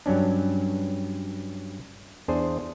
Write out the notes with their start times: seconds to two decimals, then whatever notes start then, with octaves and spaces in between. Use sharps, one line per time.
0.06 G2 F#3 C#4 D4
2.28 E2 D4 G#4 C5